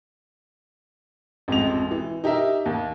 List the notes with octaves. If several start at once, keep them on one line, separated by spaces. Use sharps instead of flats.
A1 F2 G#3 F7
E3
D#4 G4 A#4 E5
D#2